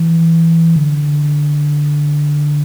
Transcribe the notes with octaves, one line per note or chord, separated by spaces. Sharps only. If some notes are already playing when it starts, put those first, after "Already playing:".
Already playing: E3
D3